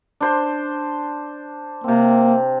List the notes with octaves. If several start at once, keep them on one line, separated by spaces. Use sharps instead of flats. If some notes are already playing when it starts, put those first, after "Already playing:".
D4 C5 C6
C3 A#3 C4